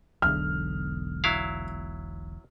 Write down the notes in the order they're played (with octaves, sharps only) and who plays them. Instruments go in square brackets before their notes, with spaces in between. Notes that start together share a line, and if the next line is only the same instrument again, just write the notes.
[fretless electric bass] E1 B1 D3 [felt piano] F6
[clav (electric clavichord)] F#3 E4 F5